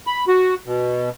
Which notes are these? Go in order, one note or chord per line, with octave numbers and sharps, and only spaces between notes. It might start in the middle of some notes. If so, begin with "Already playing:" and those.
B5
F#4
B2